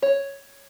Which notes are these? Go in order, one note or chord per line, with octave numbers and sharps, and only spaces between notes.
C#5